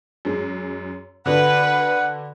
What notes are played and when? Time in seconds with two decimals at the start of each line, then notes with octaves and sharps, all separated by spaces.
0.25 F#2 G#3
1.26 D3 D4 F#4 B4 F#5